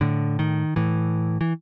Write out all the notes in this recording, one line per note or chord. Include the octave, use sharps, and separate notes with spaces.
A2 D3
D#3
A2 E3
E3